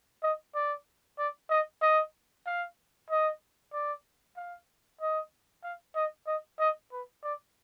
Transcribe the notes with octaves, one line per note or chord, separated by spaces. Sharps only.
D#5
D5
D5
D#5
D#5
F5
D#5
D5
F5
D#5
F5
D#5
D#5
D#5
B4
D5